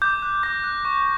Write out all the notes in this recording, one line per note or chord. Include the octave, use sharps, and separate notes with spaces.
D6 G6
F#6
D6 A#6
F#6
C#6